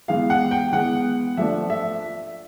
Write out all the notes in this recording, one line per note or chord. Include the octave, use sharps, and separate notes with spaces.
E3 G#3 B3 F5
F#5
G5
E3 G#3 B3 F#5
F3 A3 D4 E5
E5